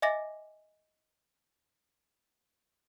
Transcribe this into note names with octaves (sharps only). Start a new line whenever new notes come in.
D#5 E5 G#5 D6 A6 A#6